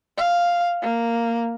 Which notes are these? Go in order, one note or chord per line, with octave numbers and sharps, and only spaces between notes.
F5
A#3